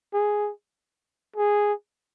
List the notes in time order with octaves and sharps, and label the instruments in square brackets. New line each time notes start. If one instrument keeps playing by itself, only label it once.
[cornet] G#4
G#4